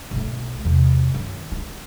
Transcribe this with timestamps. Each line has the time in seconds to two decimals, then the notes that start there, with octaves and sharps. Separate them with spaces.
0.11 B1 A3
0.65 E2 C3
1.14 F#2 D#3
1.52 F4